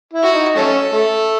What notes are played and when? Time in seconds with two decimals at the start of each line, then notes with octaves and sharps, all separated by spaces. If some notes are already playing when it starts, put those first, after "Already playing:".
0.13 E4
0.23 F#4
0.34 D#4
0.56 F#3 A3 C#4 A4
0.90 A3